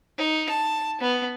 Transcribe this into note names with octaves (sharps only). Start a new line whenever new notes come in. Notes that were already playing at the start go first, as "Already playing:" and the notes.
D#4
A5
B3